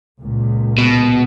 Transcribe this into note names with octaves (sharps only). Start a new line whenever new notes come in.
C#2 A#2
B2